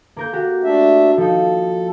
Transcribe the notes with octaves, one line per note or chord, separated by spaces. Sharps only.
A#3 A#4 G6
F#4 G4
A3 D4 E5
F3 D#4 A4